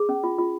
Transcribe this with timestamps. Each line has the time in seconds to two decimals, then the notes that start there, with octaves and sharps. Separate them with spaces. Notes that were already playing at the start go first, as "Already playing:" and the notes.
Already playing: G#4
0.09 C#4
0.24 F4
0.38 F4